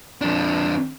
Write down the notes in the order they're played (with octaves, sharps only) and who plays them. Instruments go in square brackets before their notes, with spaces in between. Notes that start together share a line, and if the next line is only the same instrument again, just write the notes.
[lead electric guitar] F2 D4